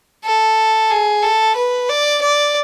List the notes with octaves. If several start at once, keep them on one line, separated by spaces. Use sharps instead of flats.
A4
G#4
A4
B4
D5
D5